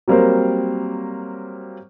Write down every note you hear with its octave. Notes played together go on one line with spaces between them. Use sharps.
F#3 G3 A#3 C4 A#4 C5